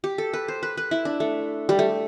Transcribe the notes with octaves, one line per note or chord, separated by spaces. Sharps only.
G4
A4
B4
C5
B4
B4
E4
D4
A3
G3
A3